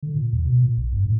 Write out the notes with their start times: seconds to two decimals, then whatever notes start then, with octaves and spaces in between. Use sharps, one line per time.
0.03 D3
0.15 A#2
0.33 D#2
0.45 B2
0.62 A#2
0.77 A#1
0.93 G2
1.05 A2